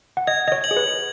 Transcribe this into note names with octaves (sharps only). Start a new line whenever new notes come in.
F#5
D#5 G#6
D#5
C#5
F#7
G#4
B4